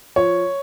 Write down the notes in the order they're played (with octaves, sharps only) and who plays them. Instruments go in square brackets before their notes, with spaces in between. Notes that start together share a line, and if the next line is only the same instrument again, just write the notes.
[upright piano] F3 C#5